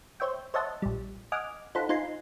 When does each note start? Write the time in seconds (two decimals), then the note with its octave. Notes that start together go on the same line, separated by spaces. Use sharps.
0.20 C5 C#5 E5 G5
0.54 C5 C#5 D#5 E5 F#5 A5
0.82 A#1 G3
1.32 D#5 F#5 G#5 D6 F6
1.75 D#4 F4 A4 C5 F#5 B5
1.89 D#4 F4 C5 G#5 C6